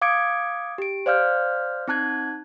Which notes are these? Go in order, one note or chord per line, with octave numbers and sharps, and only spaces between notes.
F5 D6 D#6 G#6 C#7 D7
G4 D7
C5 D5 F5 F6 G6
C4 D#4 A5 F#6 G#6